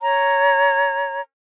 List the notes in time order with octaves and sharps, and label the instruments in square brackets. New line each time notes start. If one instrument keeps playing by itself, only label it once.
[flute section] C#5 A#5